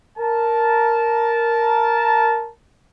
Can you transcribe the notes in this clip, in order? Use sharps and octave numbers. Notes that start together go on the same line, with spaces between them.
A#4 A5